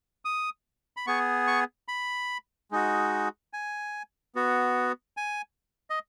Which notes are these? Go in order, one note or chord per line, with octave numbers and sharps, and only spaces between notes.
D#6
B5
B3 G#4 C#6
C#6
B5
G#3 D#4 F#4
G#5
B3 F#4
G#5
D#5